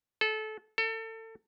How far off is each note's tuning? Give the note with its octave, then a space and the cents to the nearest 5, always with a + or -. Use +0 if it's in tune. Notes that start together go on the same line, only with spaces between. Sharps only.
A4 -25
A4 +30